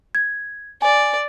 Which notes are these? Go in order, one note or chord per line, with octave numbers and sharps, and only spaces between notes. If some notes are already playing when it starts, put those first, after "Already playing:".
G#6
D5 G#5